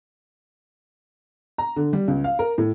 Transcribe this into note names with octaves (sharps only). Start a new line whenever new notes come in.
A#5
D3
G3
C#2
F5
A#4
A2